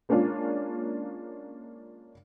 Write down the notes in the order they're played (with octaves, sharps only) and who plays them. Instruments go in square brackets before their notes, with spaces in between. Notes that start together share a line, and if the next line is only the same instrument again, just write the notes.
[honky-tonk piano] G#3 A#3 C#4 D4 F4